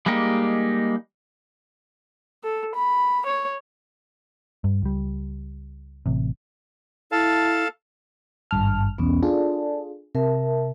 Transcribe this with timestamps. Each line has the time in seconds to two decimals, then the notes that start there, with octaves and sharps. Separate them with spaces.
0.06 G3 G#3 A#3 D#4 G4
2.44 A4
2.75 B5
3.26 C#5
4.64 G2
4.82 C#2 G3
6.06 A1 C3
7.12 E4 A4 F5 A5
8.51 G#1 G2 A5 F6
8.98 B1 E2 B3 C#4
9.23 D4 F4 G#4 A4 D5 A5
10.15 C3 A#4 E5 A5